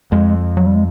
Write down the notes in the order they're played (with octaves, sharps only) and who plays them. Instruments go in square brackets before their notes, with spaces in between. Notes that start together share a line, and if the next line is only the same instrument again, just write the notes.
[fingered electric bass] F2 [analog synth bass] G#3
[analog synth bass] F#3
G3
G#3